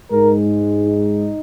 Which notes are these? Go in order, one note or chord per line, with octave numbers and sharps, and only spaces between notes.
G#2 G#3 A#4
D#4